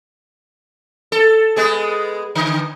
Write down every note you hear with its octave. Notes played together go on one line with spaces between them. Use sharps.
A4
G#3 B3 G#4
D3